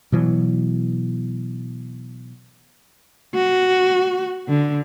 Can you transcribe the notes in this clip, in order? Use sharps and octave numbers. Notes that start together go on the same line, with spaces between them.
B2 E3 F#3
F#4
D3